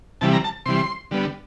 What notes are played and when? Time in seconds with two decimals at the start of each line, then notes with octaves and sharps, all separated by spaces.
0.21 C3 E3 G3 A5
0.33 A#5
0.44 A5
0.66 C3 E3 G3 C6
1.11 D3 G3 B3